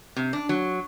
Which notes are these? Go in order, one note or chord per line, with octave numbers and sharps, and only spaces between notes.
C3
D4
F#3